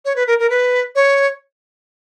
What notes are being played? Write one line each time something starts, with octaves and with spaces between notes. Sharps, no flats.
C#5
B4
A#4
A#4
B4
C#5